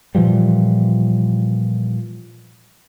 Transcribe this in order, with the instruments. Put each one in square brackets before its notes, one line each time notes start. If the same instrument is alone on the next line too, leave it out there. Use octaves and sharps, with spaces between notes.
[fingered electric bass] A#2 E3 F3 G3